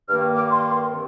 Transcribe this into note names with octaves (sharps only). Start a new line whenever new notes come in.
G2 D#3 A#3 F6
D6
C6
C3 D#3